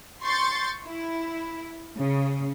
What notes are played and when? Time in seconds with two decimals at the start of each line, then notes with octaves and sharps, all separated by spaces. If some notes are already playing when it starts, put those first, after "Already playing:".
0.24 C6 C#6 G6 A6
0.86 E4
1.97 C#3